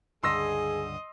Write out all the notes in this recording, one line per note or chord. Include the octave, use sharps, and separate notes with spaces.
C#2 G2 D3 G#4 D#5 C6 E6 A#6